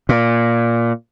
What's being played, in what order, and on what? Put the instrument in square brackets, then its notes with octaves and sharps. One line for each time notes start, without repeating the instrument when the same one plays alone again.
[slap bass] A#2